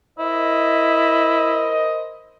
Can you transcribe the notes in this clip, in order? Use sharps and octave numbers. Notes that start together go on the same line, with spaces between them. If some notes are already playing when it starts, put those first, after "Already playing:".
E4 A#4 C5 D#5